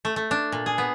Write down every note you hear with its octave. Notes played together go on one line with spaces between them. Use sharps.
A3
A3
D4
A#2
G#4
B3